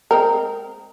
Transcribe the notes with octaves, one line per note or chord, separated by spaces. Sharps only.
G#3 C4 A#4